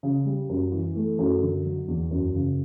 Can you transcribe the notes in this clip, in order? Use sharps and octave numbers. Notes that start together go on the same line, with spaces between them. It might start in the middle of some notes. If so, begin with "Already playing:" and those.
C#3
G3
F#2
E3
A3
F#2
D3
F#3
E2
F#2
C#3